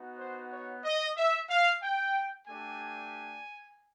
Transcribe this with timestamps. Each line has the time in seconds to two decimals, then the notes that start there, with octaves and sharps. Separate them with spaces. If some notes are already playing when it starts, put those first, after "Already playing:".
Already playing: B3 D#4 F#4
0.19 C5
0.51 C#5
0.84 D#5
1.16 E5
1.49 F5
1.82 G5
2.48 A3 D4 G4 G#5